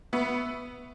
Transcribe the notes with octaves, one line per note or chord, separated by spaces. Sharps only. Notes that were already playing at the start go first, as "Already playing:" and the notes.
B3 B4 E5 C#6 E6